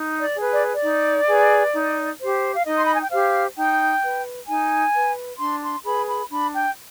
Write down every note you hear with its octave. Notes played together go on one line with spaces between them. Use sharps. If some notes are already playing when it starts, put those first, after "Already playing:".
Already playing: D#4
D5
G#4 B4
D5
D5
D#4
G#4 B4
D#4
G4 C5
F5
D#4 D#5
C6
B5
G#5
G5
G4 C5 F5
D#4 G5
B4
D#4 G#5
B4
D4 C6
C6
G#4 B4 B5
B5
D4 B5
G5